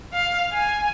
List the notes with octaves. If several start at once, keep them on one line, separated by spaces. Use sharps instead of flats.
F5
G#5